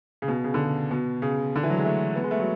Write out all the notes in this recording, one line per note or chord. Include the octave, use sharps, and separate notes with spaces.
C#3
B2
C#3
D3
C#3
B2
C#3
D3
E3
F#3
G#3
A3
B3
G#3
A3
F#3